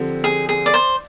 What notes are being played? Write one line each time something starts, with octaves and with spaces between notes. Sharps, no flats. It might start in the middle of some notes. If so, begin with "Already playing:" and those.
Already playing: D3 F3 C4 G4
G#4
G#4
D5
C5